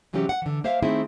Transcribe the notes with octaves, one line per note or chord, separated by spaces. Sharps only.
C3 E3 F#3 G#3 C#4 G4
F#5
D3 E3
A#3 C5 E5 F5
D#3 A3 C4 D#4 E4 G#4